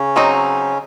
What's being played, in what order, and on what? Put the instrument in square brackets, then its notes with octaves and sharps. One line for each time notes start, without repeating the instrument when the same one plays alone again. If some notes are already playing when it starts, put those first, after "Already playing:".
Already playing: [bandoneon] C#3 C#4
[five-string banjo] F#3 C4 D#4